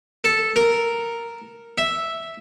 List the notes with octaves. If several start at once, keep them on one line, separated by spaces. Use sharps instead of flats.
A4
A#4
E5